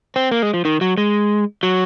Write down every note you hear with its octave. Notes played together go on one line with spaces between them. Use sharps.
C4
A#3
G#3
F3
D#3
F#3
G#3
F#3